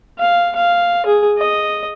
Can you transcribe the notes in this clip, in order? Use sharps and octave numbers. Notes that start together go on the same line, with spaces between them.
F5
F5
G#4
D#5